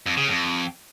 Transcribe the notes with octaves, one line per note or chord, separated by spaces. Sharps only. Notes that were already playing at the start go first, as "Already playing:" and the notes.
F2
C#3
F2